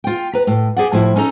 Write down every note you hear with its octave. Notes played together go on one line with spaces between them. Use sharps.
F4 G5
B4 A#5
A2
G4 G#4 D5 F#5
A2 F3 E4
C#4 D#4 A4 A#5